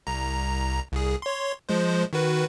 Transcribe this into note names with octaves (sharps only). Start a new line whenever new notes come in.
C2 A#5
C2 G#4
C#5 C6
F3 G#3 C5
D#3 F#4 B4